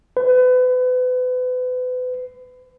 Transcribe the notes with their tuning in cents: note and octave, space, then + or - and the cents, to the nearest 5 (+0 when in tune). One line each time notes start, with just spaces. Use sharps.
B4 +35